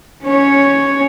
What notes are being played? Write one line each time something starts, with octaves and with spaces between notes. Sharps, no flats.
C#4 C#5